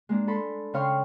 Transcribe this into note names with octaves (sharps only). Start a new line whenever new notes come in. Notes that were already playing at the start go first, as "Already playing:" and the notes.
G#3 A#3 D4
A4 B5 C6
C#3 C#5 F5 G5 C6 C#6